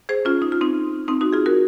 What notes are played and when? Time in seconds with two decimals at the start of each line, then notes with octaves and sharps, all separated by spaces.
0.09 G#4 C5
0.25 C#4 F4
0.42 D#4
0.52 F4
0.61 C4 D#4
1.08 C4 D#4
1.21 D#4 F#4
1.33 F4 G#4
1.46 F#4 A#4